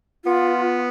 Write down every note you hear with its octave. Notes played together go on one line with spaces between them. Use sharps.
B3 F4